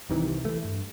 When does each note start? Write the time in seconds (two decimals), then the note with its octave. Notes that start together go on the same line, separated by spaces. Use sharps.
0.09 C2 C3 D#3 E3
0.45 E3 A3
0.65 G2